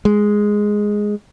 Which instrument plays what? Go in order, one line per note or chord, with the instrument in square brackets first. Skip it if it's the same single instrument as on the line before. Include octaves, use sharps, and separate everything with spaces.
[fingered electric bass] G#3